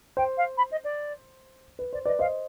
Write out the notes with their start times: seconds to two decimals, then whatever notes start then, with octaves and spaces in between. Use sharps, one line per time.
0.17 C5 G5
0.37 F5
0.57 B5
0.71 D#5
0.84 D5
1.79 B4
1.93 C5 D5
2.05 B4 D5 D#5
2.19 C5 D#5 F5